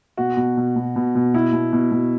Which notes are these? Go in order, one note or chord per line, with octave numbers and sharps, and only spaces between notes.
B2 F#4
B2
B2
B2
B2
B2
B2 E4
B2
B2
B2